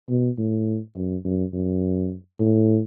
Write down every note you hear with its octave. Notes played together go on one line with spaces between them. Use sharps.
B2
A2
F#2
F#2
F#2
A2